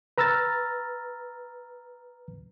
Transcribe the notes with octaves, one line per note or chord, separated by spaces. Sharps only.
B4 A#5 E6 F6 A6